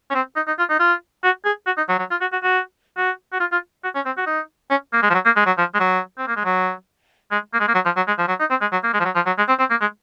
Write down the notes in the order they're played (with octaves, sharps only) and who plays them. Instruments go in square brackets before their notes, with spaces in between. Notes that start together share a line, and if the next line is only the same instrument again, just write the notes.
[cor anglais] C#4
C4
D#4
D#4
F4
D#4
F4
F#4
G#4
F#4
D#4
F#3
F#3
F4
F#4
F#4
F#4
F#4
F#4
F4
F4
F#4
C#4
C4
F#4
D#4
C#4
A#3
G#3
F3
F#3
A#3
G#3
F#3
F3
G#3
F#3
C4
A#3
G#3
F#3
G#3
A#3
G#3
A#3
F#3
F3
F#3
G#3
F3
F#3
D#4
C4
G#3
F#3
A#3
G#3
F3
F#3
F3
F#3
G#3
C4
C4
A#3
G#3